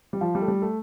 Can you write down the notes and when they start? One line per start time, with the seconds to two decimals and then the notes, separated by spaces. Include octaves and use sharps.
0.13 G3
0.21 F3
0.35 G3
0.42 A3
0.48 G3
0.62 A3